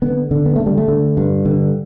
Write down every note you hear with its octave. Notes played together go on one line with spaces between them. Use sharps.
D3 B3
D3
B3
D3 A3
G3
A3
D3
G2
D3